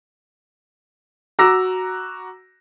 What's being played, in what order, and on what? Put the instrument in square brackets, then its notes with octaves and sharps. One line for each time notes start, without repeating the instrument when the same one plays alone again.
[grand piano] F#4 A#5 D6 E6 A#6